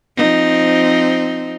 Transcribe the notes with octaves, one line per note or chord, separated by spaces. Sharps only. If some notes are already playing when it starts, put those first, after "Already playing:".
F3 C4 D#4